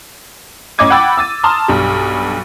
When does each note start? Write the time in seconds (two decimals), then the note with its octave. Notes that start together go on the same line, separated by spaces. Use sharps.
0.78 A1 C#4 D#5 D6 G#6 D#7
0.90 F#5 G5 B5 E6 A6
1.18 E6 A6 D#7
1.44 A5 A#5 C6 D#6 F6
1.68 B1 G2 G3